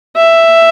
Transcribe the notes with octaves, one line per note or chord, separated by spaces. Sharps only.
E5